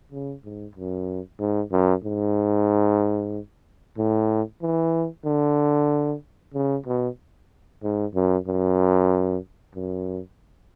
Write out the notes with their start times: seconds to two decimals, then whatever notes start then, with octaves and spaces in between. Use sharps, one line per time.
0.12 C#3
0.44 G#2
0.75 F#2
1.39 G#2
1.72 F#2
2.04 G#2
3.97 A2
4.61 E3
5.25 D3
6.54 C#3
6.86 B2
7.83 G#2
8.15 F#2
8.47 F#2
9.75 F#2